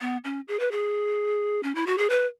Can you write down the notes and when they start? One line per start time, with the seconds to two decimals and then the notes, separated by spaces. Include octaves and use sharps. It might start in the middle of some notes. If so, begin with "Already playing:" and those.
0.01 B3
0.24 C#4
0.48 G#4
0.60 B4
0.71 G#4
1.63 C#4
1.75 E4
1.86 F#4
1.98 G#4
2.10 B4